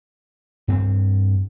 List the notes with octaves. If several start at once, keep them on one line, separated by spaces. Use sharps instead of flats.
G2 C4